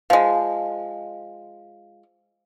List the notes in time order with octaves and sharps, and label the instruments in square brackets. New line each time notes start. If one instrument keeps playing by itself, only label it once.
[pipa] F3 G#3 [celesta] F5